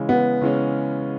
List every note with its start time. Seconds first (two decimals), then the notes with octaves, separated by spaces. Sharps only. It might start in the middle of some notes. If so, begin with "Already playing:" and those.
Already playing: C#3 E3 G#3 C#4
0.09 B3
0.41 C#3 E3 G#3 C#4